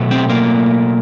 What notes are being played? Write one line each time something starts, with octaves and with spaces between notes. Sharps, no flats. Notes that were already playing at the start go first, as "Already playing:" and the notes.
Already playing: B2 F#3 A3
C4
A#3